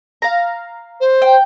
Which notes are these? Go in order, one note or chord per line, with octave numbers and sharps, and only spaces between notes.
F5 A#5
C5
G5